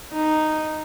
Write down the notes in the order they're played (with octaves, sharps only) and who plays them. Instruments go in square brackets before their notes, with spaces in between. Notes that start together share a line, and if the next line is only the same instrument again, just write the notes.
[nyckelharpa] D#4